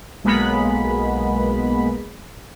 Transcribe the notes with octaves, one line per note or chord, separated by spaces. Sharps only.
B1 G#3 A#3 B3 B5